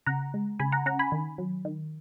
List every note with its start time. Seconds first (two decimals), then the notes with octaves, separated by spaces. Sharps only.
0.06 C#3 F#5 A#5
0.34 G#3
0.59 C#3 G#5 B5
0.72 F#5 A#5
0.86 C#4 F#5 A#5
0.99 G#5 B5
1.12 D#3
1.38 F#3
1.65 D#3